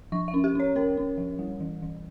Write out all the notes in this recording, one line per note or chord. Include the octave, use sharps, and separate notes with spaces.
F3 C#6
E5
C#4
G4
C#4 C#5
C#4 A#4
C#4
F3
G3
E3
E3